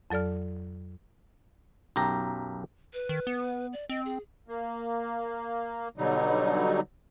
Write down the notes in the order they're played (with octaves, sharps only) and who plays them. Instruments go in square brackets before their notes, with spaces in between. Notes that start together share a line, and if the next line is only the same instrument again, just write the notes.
[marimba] F2 F#3 A4 D5 F6
[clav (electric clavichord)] B1 F#2 G4 A#5
[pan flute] B4
[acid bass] D#3
B3
[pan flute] D5
[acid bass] C4 [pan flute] D#5
[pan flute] G#4
[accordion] A#3
B2 D3 F#3 G3 D#4